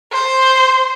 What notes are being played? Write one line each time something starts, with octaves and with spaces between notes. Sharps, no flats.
C5